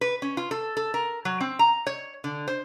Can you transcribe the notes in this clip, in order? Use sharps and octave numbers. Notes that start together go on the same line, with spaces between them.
B4
C#4
F4
A4
A4
A#4
F#3
C4
A#5
C#5
D3
C5